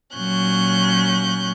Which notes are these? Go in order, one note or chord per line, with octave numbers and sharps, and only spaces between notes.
A#2 F#3 C#4 F#6 G6